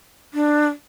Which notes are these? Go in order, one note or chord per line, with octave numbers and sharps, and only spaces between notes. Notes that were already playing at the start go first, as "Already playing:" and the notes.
D4